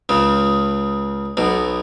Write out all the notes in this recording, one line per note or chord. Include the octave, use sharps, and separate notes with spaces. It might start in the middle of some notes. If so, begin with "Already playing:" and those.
C#2 C#3
B1 B2